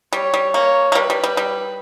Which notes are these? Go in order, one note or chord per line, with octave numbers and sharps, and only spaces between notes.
G3 C#5
G3
A#3 C#5
A#3
G3 B4
G3
G3
G3